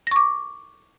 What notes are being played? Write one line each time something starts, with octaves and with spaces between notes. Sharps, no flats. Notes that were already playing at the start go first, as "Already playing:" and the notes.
C#6 D6 A#6